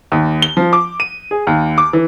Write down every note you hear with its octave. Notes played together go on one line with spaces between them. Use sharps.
D#2
G7
F3
D6
D#7
G#4
D#2
D6
E3